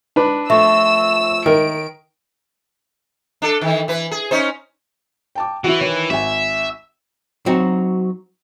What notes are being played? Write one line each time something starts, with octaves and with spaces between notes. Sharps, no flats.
D4 B4
F3 A3 E5 C#6 E6
D#3 A#4 E5 D7
D4 A4
D#3 E3
E3 B4
G#4
C#4 D#4 C5
G5 A5 D6
E3 E4 F#4
D#3 C#5
G#1 E5 G#5
F#3 C4 D#4 F#4